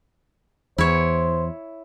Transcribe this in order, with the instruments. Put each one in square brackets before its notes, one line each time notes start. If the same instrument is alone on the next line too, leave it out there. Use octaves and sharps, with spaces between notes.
[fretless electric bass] E2 [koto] E4 C#5 [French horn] C5